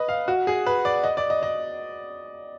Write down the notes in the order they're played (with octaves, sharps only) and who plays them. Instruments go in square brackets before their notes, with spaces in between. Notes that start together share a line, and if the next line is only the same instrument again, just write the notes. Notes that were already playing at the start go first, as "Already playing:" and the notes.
Already playing: [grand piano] B4 D#5
F5
F#4
G#4
B4
D5
D#5
D5
D#5
D#5